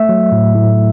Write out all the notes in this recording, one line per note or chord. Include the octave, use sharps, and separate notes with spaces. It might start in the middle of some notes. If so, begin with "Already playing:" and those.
Already playing: A3 E5
F#3
A2
A2